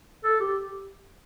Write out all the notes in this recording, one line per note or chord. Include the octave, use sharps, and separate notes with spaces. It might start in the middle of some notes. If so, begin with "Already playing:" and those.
A4
G4